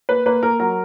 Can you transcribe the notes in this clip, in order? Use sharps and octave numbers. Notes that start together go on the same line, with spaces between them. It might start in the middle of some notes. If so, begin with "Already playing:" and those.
A#3 B4
A#3 B4
A#3 A#4
F#3 A#4